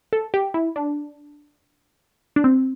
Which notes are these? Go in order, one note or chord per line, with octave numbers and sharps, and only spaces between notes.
A4
G4
E4
D4
D4
C4